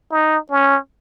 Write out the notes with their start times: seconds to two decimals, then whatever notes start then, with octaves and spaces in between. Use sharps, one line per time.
0.11 D#4
0.50 C#4